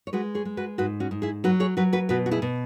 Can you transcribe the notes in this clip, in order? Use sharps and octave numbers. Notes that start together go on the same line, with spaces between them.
C#5
G#3 F#4 B4
G#4 C#5
G#3
F#4 B4
G#2 F#4 B4
C#4 F#4
G#2
E4 G#4
F#3 F#4 B4
G#4 C#5
F#3 F#4 B4
F#4 B4
B2 F#4 B4
F#4
E4 G#4
B2